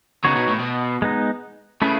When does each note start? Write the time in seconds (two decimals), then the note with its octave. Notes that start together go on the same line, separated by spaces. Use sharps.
0.24 C#3 B3 D#4 F#4 C#5
0.36 B2
0.48 A2
0.60 B2
1.02 G#3 B3 D#4
1.81 C#3 A3 E4 G#4 B4